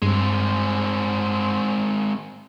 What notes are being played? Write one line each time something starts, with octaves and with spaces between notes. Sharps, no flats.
G2 G#3 C4